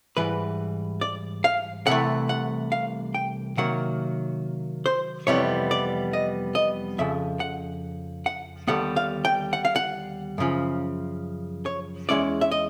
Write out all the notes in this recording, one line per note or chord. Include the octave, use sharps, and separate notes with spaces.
G#2 E3 G3 B4
D5
F5
C2 C3 E3 A3 F#5
F#5
F5
G5
C3 D#3 F#3 A#3 F#5
C5
F2 C3 E3 G3 B3 C#5
D5
D#5
D#5
F2 C#3 F3 E5
F#5
F#5
D#2 D3 G3 B3 F#5
F5
G5
F#5
F5
F#5
F#2 C#3 F3
C#5
E2 B2 G#3 C#4 E4 D5
E5
D#5